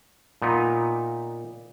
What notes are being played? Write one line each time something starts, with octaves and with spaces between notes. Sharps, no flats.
A#2 B3 D#4